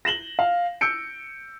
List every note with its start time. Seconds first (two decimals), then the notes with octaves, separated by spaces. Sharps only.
0.05 A#6 E7 F#7 G7
0.39 F5
0.81 E6 G6 C#7 D7